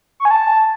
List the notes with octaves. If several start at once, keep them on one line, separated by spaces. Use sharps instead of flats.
C#6
G#5
A5